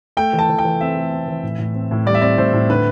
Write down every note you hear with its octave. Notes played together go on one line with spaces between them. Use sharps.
A3 G5
E3
A5
E3
G5
E3
C4 E5
A3
C4
E3
A2
A2
C4
A2
G3 D5
E5
C4 D5
A2 C5
A2
D3 B4